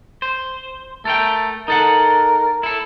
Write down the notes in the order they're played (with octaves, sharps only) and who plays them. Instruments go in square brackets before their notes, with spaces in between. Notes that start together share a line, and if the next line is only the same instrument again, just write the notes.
[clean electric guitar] C5
[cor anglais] A3 [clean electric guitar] A4 A#4 G5
[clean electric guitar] D#4 A4 F#5 [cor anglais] A#4
[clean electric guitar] E4 A4